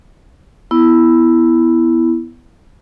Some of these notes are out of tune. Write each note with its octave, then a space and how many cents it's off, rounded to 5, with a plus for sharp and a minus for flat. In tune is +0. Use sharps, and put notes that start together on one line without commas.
B3 +0 E4 +0